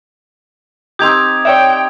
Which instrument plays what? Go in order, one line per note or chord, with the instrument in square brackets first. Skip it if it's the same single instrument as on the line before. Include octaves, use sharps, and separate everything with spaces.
[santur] C4 D#4 G4 [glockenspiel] D#6 G#6 F7 [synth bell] G6
[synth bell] C#5 D5 E5 [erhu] G5